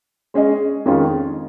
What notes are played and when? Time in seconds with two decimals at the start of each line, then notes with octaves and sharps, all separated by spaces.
0.34 G#3 C#4 G#4 D#5
0.85 F2 D#3 G#3 C#4 F4